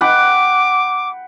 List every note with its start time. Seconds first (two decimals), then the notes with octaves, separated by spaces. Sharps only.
0.01 F#5 G5 B5 D6